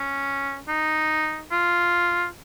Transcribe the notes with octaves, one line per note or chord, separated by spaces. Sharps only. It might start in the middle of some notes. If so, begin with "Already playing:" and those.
Already playing: C#4
D#4
F4